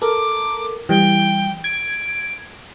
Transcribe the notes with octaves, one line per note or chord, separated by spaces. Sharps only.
A4 A#4 D6
E3 G3 G5
G#6 D7